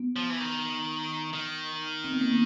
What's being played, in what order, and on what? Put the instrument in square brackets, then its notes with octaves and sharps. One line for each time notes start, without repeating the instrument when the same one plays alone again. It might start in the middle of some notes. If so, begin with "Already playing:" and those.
Already playing: [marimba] B3
[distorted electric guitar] F3
E3
D#3
D#3
[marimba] C4
B3
A#3
B3